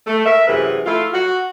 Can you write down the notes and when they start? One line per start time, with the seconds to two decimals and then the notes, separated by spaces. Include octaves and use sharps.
0.07 A3
0.26 A#4 E5
0.48 F#2 C3 E3 G#4 B4
0.86 A3 E4 F4
1.14 F#4